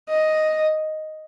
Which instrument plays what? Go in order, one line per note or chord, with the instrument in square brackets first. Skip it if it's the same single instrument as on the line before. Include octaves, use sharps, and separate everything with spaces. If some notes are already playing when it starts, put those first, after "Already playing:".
[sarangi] D#5